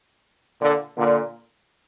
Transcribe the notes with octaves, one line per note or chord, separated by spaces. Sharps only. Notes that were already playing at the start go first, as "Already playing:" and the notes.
A#2 D3
A#2 D3